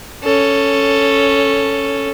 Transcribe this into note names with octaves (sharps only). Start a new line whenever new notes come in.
C#4 A4